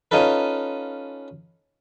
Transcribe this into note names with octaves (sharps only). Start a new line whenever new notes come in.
C#4 D#4 F4 A4 B4